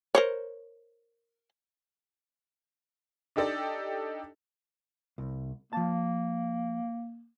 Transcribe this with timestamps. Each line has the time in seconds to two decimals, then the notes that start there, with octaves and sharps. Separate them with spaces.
0.15 A#4 C5 C#5
3.36 D4 D#4 G4 A4 D5 D#5
5.18 C2
5.73 F3 A#3 A5